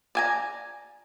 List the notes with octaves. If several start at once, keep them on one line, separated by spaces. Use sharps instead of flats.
D5 G#5 A#5